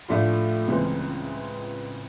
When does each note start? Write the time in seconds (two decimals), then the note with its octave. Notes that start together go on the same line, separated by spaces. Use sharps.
0.08 A2 F3 A3 D4 F4
0.67 C#2 C#3 E3 G#3 C4